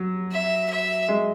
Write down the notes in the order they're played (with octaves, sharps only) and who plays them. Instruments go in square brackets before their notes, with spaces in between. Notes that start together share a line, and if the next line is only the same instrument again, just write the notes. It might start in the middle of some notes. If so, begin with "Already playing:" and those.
Already playing: [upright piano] F#3
[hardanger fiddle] E5
E5
[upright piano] G#3